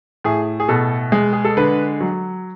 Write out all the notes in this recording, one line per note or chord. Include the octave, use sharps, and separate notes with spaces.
A2 G#4
G#4
B2 A4
G#3
G#4
A4
D3 B4
F#3